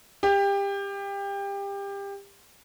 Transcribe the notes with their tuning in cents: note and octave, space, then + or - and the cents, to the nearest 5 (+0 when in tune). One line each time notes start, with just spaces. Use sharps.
G4 +25